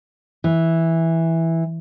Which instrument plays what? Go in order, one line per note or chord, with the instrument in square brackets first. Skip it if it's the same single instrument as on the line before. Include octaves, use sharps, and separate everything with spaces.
[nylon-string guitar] E3